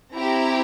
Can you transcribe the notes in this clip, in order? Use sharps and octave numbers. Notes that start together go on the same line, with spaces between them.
C4 E4 G4 A#5